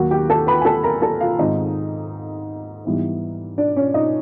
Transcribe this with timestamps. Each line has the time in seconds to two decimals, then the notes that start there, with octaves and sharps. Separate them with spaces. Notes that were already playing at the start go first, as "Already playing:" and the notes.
Already playing: D#2 D#3 F#3 A#3 F#4 F#5
0.11 G4 G5
0.30 A4 A5
0.47 B4 B5
0.61 G#5
0.65 A4 A5
0.83 A#4 A#5
1.02 A4 A5
1.21 F4 F5
1.39 G#2 D#3 G#3 C4 D#4 D#5
2.85 G#2 E3 G3 B3
3.58 D4 D5
3.76 C#4 C#5
3.94 D#4 D#5